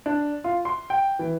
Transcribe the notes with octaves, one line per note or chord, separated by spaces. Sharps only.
D4
F4
C6
G5
E3